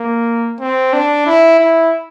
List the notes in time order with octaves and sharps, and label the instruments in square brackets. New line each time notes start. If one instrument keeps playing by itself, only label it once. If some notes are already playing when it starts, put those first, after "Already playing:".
Already playing: [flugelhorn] A#3
C4
D4
E4
E4